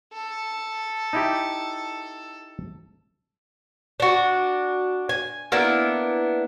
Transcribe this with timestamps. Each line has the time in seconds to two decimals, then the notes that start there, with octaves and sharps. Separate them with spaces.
0.13 A4
1.13 D#4 E4 G4
4.00 D4 F#4
5.09 G#5
5.52 A#3 B3 D4 E4